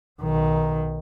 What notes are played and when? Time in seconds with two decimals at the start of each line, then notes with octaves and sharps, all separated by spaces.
0.22 B1 D#3